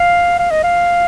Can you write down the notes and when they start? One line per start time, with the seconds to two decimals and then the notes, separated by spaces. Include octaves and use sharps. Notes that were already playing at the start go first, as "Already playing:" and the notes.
Already playing: F5
0.38 F5
0.51 D#5
0.63 F5